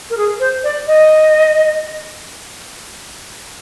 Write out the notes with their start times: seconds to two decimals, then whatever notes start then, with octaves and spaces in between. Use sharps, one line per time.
0.10 A#4
0.17 G#4
0.40 C5
0.64 D5
0.87 D#5